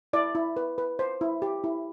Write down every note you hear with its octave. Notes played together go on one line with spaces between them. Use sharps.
E4 D5
E4
B4
B4
C5
E4
G4
E4